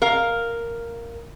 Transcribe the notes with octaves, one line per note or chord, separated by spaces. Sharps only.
A#4 F5